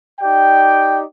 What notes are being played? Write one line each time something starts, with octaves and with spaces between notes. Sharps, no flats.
D#4 G4 D5 G5